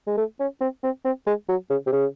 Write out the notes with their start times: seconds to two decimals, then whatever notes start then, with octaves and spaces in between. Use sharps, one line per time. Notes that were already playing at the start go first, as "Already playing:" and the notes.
0.07 G#3
0.17 A3
0.40 C#4
0.61 C4
0.83 C4
1.05 C4
1.27 G#3
1.49 F#3
1.70 C#3
1.87 C3
1.92 C#3